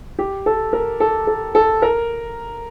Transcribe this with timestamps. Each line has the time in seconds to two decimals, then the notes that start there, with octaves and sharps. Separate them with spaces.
0.19 G4
0.46 A4
0.73 A#4
1.00 A4
1.27 A4
1.55 A4
1.82 A#4